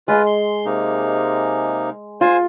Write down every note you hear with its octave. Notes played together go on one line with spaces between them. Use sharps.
G#3 F4 B4
C6
C3 A#3 D#4
F4 C5 G#5